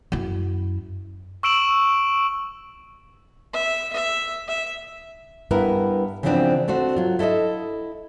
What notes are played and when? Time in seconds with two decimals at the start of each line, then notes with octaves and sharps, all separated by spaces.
0.12 F#2 E4
1.43 C#6 E6 D7 E7 F#7
3.53 E5
3.93 E5
4.48 E5
5.51 G2 B3 E4 A#4 B4
6.23 C#3 E3 F3 B3 C4 D4
6.68 A3 C4 D4 F#4
6.97 F#3 F4
7.19 E4 A4 C5 D#5 E5